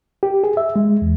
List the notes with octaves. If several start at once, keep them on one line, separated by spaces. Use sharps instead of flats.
G4
G#4
E5
G#3
E2